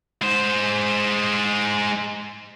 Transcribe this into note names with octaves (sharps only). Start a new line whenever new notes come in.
G#3 C5